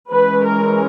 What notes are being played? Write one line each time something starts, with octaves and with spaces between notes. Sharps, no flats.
E3 G#3 C#4 B4
A#4